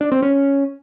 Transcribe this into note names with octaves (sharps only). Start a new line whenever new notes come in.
D4
C4
C#4